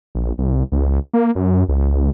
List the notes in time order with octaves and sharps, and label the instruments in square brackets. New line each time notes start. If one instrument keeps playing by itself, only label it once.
[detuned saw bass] A#1
C2
C#2
A#3
F#2
C#2